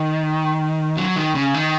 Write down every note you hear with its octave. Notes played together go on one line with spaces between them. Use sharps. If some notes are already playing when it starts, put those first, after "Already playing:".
Already playing: D#3
F#3
D#3
C#3
D#3